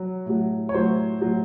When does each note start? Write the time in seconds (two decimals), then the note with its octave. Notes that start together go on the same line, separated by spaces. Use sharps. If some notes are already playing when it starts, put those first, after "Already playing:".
Already playing: F#3
0.26 A2 F#3
0.69 C#5
0.74 A2 F#3 C5
1.22 A2 F#3